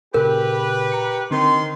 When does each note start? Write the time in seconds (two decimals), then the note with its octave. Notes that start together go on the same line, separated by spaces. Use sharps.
0.14 A#2 C#3 G4 G#4 A#4 B4
0.92 A#5 C#7
1.31 D3 D#3 C4 C6